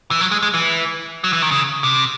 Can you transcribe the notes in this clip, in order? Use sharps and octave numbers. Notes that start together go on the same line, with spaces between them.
E3
F#3
G#3
G#3
E3
F#3
E3
D#3
C#3
C3